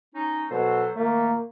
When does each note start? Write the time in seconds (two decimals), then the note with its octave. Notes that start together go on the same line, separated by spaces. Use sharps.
0.15 C#4 D#4
0.51 B2 F#3 A4 C5
0.96 A#2 D#3 A3 A#3